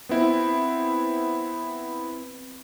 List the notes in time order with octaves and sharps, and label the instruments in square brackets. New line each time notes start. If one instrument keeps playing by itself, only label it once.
[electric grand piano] B3 C4 E4